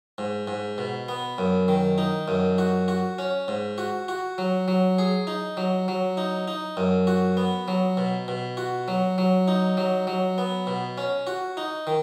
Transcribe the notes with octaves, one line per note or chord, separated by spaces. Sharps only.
G#2
G#2
B2
B3
F#2
D#3
D#4
F#2
F#4
F#4
C#4
G#2
F#4
F#4
F#3
F#3
G#4
D#4
F#3
F#3
D#4
D#4
F#2
F#4
B3
F#3
B2
B2
F#4
F#3
F#3
D#4
F#3
F#3
B3
B2
C#4
F#4
D#4
D#3